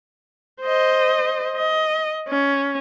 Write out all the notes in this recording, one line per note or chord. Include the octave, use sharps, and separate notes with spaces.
C5 D#5
D#5
C#4